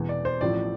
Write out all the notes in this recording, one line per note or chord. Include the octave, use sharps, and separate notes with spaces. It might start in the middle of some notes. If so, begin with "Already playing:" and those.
Already playing: E1 E2 E3
D5
C5
A1 A2 F3 A3 D5